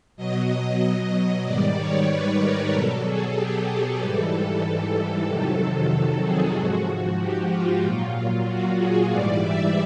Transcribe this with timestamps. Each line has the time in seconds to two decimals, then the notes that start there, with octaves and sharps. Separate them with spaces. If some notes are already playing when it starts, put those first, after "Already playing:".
0.16 B2 F#3 D#5
0.48 D#5
1.44 G#2 D#3 G3 D5
1.76 C#5
2.08 B4
2.40 A#4
2.72 B2 F#3 A4
3.04 G#4
3.35 G4
3.67 G#4
3.99 G#2 E3 G3 A4
5.26 F2 C3 D#3 F#3
5.91 A4
6.22 G#4
6.55 G#2 F3 F#4
6.87 F#4
7.18 G4
7.51 F4
7.82 A#2 F#3
8.47 F#4
8.78 G#4
9.10 G#2 E3 G3 D5
9.42 E5